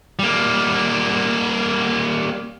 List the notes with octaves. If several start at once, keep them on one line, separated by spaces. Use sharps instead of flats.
G3 A#3